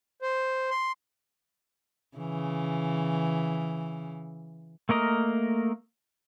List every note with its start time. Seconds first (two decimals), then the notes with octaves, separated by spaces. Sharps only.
0.22 C5
0.70 C6
2.18 C#3 E3
4.89 A3 A#3 A#4 D#5